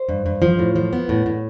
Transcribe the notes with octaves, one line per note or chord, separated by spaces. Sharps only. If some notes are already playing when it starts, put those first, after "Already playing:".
Already playing: C5
G2
G2
F3
A2
F3
B3
A2
A2